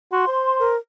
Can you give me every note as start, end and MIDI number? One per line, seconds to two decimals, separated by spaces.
0.12 0.25 66
0.12 0.56 84
0.28 0.72 72
0.59 0.76 70